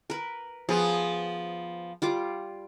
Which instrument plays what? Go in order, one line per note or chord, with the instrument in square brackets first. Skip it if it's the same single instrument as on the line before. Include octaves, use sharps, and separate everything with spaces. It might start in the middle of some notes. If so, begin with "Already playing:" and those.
[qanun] A#4 B4
[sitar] F3 B3 [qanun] G#4
[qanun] G3 F4 D6